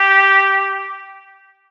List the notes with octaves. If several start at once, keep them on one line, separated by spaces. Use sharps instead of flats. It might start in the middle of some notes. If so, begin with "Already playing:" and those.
Already playing: G4